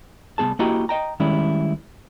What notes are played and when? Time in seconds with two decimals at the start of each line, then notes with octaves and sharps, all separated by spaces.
0.38 C2 E3 B3 G#4 A5
0.59 A#3 E4 F#4 G4 D#5 A#5
0.89 D#5 G5 A#5
1.20 D#3 G3 G#3 C#4 E4